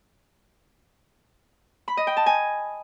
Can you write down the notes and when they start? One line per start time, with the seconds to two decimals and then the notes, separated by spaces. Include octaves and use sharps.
1.88 B5
1.97 D#5
2.07 G5
2.17 A5
2.26 G#5